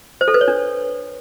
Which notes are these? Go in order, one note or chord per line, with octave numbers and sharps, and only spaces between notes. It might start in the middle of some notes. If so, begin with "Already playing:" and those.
C5
A4
B4
C#5
D4